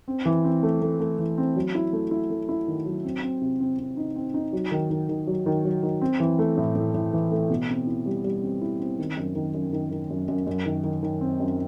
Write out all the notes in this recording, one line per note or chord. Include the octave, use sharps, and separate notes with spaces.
C4
E3
C4
A3
A3
A3
E3
C4
F#3
E4
A3
E4
A3
E4
D#3
F#3
C4
C4
C3
C4
C4
D#4
C4
D#4
F#3
D#3
D#3
D#3
F#3
D#3
F#3
D#3
C4
E3
A3
A2
A2
A2
E3
A3
B2
C4
E4
G3
G3
C4
E4
C4
D#3
F#2
D#3
F#2
D#3
D#3
F#2
F#2
F#2
D#3
D#3
D#3
C4
F#2